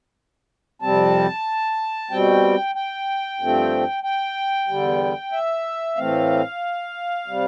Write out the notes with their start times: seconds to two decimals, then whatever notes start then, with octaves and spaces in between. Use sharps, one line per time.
0.82 F2 C3 G3 C4 A5
2.11 B2 G3 C4 G5
2.75 G5
3.40 G2 F3 A3 C4
4.03 G5
4.68 E2 D3 G3
5.32 E5
5.96 A2 E3 A3 C4 F5
7.27 C3 G3